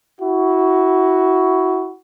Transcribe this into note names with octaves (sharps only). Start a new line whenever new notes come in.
E4 F#4